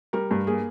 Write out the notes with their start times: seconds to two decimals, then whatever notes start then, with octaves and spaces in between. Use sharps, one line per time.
0.13 G3 A#4
0.31 G2
0.47 A#3 G#4